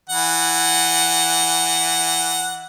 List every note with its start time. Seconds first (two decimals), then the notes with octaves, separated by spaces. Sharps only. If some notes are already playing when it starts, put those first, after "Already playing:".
0.10 E3 F#5